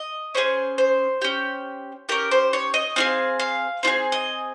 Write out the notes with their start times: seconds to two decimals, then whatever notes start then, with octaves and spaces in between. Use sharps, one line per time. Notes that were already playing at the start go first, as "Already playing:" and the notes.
Already playing: D#5
0.35 C#4 F4 G#4 C5
0.78 C5
1.22 C#4 G4
2.09 C#4 G4 A#4
2.31 C5
2.53 C#5
2.74 D#5
2.96 C4 F4 G#4 F5
3.40 F5
3.83 C4 F4
3.87 G#4
4.12 D#5